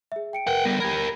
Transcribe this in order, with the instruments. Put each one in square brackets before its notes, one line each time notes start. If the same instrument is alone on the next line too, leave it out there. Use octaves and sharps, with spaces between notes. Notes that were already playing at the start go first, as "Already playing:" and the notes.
[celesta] G#4 E5
G5 C#7 D7
[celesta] A#4 B4 [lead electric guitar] F#5 G5
[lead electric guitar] G3 B3 [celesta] A#6
[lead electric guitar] G4 A#4 [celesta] B5 G#6